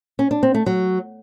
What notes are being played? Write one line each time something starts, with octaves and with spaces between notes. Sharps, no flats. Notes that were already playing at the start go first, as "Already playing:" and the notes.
C#4
D4
C4
A3
F#3